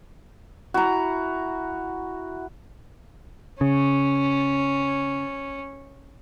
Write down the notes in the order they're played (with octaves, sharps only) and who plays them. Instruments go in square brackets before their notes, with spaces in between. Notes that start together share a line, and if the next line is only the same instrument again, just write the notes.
[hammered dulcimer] E4 A#5 [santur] F#4
[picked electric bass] C#3 [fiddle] C#4